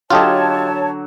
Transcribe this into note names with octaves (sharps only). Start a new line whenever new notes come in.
D3 F#3 F4 G4 C#5 D#5 A5